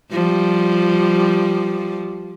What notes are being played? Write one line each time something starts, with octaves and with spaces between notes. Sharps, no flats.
F3 G3